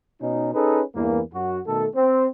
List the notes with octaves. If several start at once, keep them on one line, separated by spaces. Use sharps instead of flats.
B2 C#4 D#4
C#4 D#4 G#4 A4 B4
E2 G2 E3 A#3
F#2 F#4
B2 D#3 A3 A4
C4